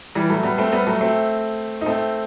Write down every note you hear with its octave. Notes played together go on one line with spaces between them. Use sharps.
E3 G3
F#3 A3
G3 B3
A3 C4
G3 B3
F#3 A3
A3 C4
D#4
A3 C4